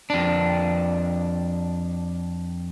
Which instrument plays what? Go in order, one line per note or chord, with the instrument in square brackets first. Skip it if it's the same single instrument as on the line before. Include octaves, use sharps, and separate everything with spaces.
[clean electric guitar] F2 D4